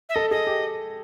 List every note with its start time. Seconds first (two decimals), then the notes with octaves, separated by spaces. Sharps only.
0.09 E5
0.15 A4 D#5
0.31 G#4 D#5
0.47 G4